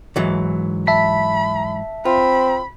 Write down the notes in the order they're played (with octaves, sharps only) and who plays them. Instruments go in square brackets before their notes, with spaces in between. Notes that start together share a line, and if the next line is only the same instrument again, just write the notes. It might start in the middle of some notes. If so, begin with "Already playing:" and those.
[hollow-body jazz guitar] G#2 E3 F#3
[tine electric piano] E5 A5 B6 [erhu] B5
[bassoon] C4 [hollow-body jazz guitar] F4 [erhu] B5